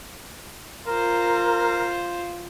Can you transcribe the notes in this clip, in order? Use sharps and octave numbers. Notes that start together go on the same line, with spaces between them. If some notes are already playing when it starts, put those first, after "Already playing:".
F4 A#4 C5